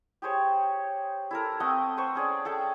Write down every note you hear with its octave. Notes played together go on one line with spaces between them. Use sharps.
G4 G#4 C5 C#5
E4 A4 A#4
A3 C4 D#5 F#5
B4 C5 C#6
C#4 G#4 D5
G#4 A4 E5 G5